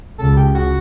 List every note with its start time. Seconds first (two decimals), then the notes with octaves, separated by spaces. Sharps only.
0.18 C#2 C#3 A4
0.37 G4
0.55 F#4